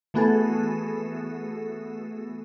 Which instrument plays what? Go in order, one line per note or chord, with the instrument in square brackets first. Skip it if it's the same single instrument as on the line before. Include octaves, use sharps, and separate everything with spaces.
[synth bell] E3 A3 B3 F#4 G#4 A4